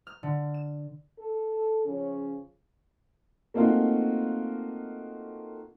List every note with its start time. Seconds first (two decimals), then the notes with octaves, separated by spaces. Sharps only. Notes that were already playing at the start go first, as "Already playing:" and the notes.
0.07 F6
0.23 D3
0.54 E7
1.18 A4
1.85 C#3 F3 C#4
3.54 A3 A#3 C4 D#4 F4 F#4